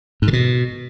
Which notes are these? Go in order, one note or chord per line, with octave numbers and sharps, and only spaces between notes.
G#2
D3
B2